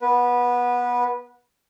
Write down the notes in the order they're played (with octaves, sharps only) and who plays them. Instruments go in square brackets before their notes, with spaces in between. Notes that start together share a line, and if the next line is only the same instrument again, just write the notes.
[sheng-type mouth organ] B3 B4